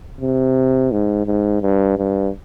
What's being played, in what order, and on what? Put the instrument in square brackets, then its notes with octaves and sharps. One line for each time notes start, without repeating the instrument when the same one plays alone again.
[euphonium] C3
G#2
G#2
G2
G2